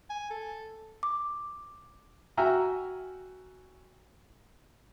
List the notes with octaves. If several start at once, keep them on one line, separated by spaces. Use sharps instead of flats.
G#5
A4
D6
F#4 E5 G5 G#5 A#5 F6